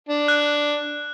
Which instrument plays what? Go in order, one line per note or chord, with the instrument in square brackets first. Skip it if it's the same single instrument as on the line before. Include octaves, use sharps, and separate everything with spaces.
[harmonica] D4
[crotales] F#6